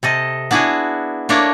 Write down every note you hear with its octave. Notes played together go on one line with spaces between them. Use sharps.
C3 A4 D#5
B3 D4 E4 F#4 G#4
A3 A#3 D4 A#4 C#5